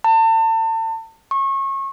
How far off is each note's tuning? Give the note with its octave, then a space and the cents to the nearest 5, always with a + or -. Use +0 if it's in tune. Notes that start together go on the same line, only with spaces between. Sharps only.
A5 +35
C#6 -30